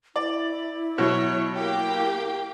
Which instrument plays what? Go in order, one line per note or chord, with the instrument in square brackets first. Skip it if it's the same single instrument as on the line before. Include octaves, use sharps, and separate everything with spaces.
[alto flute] E4 [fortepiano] D5
[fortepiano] B2 F#3 [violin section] C#5
[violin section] A#3 G4 G5